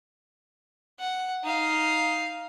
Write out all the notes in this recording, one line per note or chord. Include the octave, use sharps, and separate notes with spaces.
F#5
D#4 F5